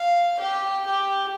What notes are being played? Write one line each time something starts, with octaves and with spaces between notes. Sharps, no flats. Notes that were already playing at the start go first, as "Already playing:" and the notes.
Already playing: F5
G4
G4